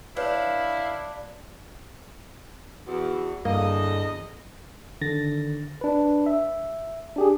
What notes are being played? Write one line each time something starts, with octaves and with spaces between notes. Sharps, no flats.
D4 E4 B4 C#5 F5
E2 F#4
E2 G2 D3 A#3 D#5
D3 D#3 A6 A#6
D4 B4
E5
D4 G4 G#4